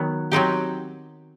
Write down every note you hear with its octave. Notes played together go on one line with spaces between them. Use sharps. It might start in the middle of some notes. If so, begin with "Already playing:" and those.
Already playing: D#3 F#3 B3
F#3 C4 D#4 G4